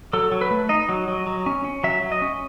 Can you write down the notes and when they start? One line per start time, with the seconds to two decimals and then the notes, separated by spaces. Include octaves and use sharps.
0.13 F#3 A4
0.32 F#3
0.41 B4
0.51 A3
0.69 D#4 D#5
0.89 F#3
1.08 F#3
1.27 F#3
1.46 C#4
1.64 C#4
1.84 F#3 E5
2.02 F#3
2.12 D#5
2.22 C#4